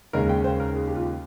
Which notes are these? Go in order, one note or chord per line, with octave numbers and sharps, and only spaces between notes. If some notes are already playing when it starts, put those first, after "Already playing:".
D#2 C#3 G#3 C#4 A#4
G5
C5
A#4
G#4
G4
F4